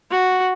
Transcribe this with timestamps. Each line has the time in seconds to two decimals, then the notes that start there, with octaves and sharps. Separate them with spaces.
0.11 F#4